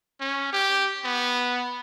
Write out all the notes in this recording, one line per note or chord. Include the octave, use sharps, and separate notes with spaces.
C#4
G4
B3